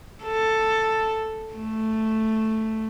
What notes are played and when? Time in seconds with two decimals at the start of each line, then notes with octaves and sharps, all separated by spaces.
0.25 A4
1.55 A3